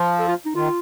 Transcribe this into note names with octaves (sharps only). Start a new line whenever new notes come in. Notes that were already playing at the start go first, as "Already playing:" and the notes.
Already playing: F3
A4
F4
D#4
D#3 F4